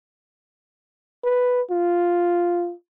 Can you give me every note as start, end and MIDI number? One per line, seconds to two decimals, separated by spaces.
1.24 1.61 71
1.70 2.73 65